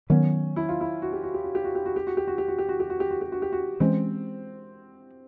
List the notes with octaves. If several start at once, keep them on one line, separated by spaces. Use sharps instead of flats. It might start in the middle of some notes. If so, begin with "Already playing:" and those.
D#3 F#3 B3 C#4
E4
F4
E4
F#4
G4
F#4
G4
F#4
G4
F#4
G4
F#4
G4
F#4
G4
F#4
G4
F#4
G4
F#4
G4
F#4
G4
F#4
G4
F#4
G4
F#4
E3 G#3 C4 C#4